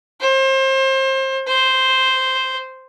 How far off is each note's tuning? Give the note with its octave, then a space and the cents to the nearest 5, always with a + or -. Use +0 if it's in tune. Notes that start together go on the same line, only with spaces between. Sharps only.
C5 +30
C5 +0